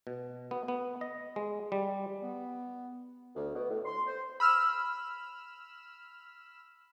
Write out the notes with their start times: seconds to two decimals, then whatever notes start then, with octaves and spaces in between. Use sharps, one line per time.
0.07 B2
0.51 B3
0.68 B3
1.01 D#5
1.36 G#3
1.72 G3
2.22 B3
3.36 D2
3.55 B2
3.70 A2
3.86 C6
4.07 C5
4.40 B5 E6 F6 E7